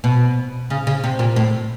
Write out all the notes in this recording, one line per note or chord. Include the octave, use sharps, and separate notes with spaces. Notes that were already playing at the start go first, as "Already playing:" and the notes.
B2
C#3
C#3
C3
A#2
A2